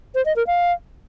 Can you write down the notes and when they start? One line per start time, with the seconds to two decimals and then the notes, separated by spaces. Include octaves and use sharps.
0.15 C5
0.26 D#5
0.36 A#4
0.47 F5